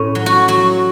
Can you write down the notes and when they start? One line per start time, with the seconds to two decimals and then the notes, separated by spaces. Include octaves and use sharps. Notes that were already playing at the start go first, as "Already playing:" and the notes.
Already playing: A2 C#4
0.15 F#3
0.26 F#4
0.48 F#3 F#4